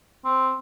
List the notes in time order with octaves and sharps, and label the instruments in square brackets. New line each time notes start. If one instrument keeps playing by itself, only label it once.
[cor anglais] C4